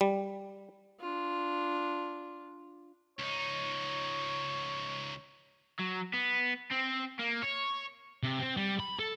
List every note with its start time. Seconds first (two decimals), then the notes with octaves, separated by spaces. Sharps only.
0.01 G3
1.00 D4 F4
3.19 C#2 D#4 C#5
5.80 F#3
6.14 B3
6.71 C4
7.19 A#3
7.42 C#5
8.23 C3
8.39 C4
8.57 G3
8.80 B5
8.99 A4